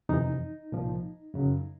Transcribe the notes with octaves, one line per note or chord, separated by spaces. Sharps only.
F2 C3 E3 D#4
C2 A#2 F3
F#2 C#3 F#3